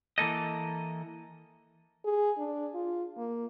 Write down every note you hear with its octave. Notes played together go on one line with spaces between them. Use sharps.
E3 A#3 A4 D#5
G#4
D4
F4
A#3